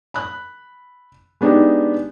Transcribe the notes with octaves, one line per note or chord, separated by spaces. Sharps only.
B5 F#6
G#3 B3 D4 D#4 G4